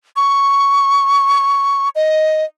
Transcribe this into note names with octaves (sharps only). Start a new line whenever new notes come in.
C#6
D#5